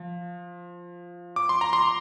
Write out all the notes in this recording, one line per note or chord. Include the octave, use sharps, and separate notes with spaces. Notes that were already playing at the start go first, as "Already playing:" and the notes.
Already playing: F3
D6
C6
A#5
C6